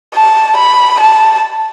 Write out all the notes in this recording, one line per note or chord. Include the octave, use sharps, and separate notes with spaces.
A5
B5
A5